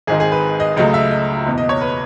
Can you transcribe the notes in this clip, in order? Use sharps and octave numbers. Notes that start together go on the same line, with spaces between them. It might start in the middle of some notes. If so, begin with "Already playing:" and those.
G#1 G#2 D#3 G#4
G#4
B4
D#5
C#2 C#3 F#3 A3 D#5
E5
D#5
F#1 E2 B2
D#5
C#5
B4